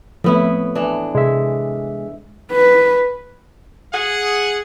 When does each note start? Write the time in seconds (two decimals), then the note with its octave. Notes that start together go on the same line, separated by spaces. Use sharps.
0.24 A2 F3 A3 B3 C4 E4
0.75 E3 D4
1.15 C3 G#3 E5
2.51 B4
3.93 G#4 F#5